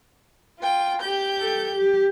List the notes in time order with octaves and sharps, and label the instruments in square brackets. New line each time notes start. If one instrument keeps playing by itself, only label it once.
[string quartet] F4 G5
G4 G6
[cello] A4
G4